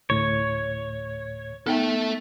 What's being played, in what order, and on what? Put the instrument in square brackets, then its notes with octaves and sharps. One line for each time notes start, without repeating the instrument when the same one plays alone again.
[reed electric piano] D2 A2 G#6 [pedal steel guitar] C#5
[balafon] B3 D#4 G5 [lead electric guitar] A4 E5